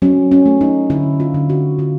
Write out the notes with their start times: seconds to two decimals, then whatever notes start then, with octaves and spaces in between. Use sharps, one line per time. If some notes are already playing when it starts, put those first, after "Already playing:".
0.02 F#3 C#4
0.31 C#4
0.46 A3
0.61 D#4
0.90 D3 E4
1.20 F4
1.34 D3
1.50 F#4
1.79 D3 F4